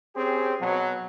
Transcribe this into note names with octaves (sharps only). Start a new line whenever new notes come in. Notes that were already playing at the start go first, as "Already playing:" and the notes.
C4 C#4 G4 G#4
B2 F#3